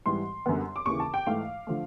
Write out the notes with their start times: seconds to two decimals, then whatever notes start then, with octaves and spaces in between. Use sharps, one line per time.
0.06 G#2 E3 G3 C6
0.46 F#2 D3 G3 B3
0.76 D6
0.86 D#2 C#3 E3 C#6
1.00 A5
1.14 G5
1.27 G#2 E3 A3 F5
1.67 D3 F3 A3